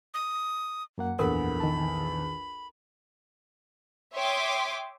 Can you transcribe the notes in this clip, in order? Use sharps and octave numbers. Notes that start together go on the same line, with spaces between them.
D#6
F#2 A#3 F#5
A#1 E2 A4 A#4 B5
D#3 A5
C#5 E5 G5 C6 D6 D#6